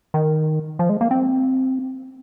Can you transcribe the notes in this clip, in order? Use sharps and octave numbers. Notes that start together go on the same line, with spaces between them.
D#3
F3
G#3
A#3
C4